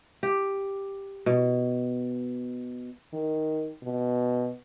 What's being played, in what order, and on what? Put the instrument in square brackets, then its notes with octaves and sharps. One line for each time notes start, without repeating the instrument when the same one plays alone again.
[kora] G4
B2
[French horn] D#3
B2